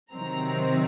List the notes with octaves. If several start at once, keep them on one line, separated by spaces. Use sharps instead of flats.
C3 D#3 F#3 C4 A#5